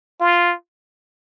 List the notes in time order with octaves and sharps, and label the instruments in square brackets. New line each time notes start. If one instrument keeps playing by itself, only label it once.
[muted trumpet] F4